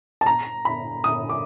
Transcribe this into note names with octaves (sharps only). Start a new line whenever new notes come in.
A5
A#5
B5
D#6
D6